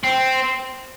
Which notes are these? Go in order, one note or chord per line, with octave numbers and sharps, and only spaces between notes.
C4